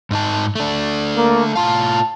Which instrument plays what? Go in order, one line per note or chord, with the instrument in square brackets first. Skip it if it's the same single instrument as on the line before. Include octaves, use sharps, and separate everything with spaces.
[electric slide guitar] G#2 D#4 A5
A3 D4
[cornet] A#3
[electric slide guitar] A2 F4 F5 [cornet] A5